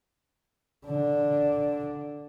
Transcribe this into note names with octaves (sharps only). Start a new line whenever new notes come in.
D3 D4